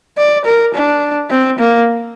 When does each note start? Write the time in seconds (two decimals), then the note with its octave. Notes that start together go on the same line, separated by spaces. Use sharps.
0.18 D5
0.45 A#4
0.74 D4
1.30 C4
1.59 A#3